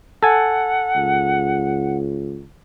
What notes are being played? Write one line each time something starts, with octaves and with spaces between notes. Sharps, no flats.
A4 F#5 G#5
C#2